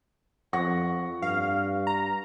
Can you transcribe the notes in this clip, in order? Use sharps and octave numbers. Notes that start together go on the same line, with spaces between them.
F2 F#5 C#6 A#6
G2 F5
A#5